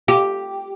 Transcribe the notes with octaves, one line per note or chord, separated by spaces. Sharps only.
G4